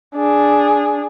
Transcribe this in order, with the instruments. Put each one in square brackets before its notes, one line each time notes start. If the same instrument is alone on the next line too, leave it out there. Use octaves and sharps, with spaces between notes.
[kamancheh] D4 G#4